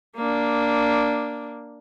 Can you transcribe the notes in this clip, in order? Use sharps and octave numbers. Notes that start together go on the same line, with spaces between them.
A#3 D4